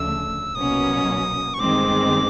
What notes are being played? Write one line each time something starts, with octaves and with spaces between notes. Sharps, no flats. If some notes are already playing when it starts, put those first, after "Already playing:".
Already playing: D2 C#3 F3 A3 D4 E6
C2 B2 F#3 A#3 C#4 D#6
C#6
G1 G2 D#3 G#3 C4 D6